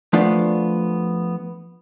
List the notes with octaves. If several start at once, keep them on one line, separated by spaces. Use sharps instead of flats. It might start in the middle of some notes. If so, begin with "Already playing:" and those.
F3 A3 B3 D4 F4